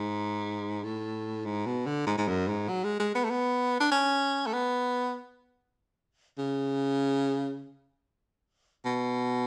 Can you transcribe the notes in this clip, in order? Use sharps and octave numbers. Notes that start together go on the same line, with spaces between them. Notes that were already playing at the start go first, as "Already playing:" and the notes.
Already playing: G#2
A2
G#2
B2
D3
G#2
G#2
F#2
G#2
F#3
G#3
G#3
B3
A3
B3
D4
C#4
A3
B3
C#3
B2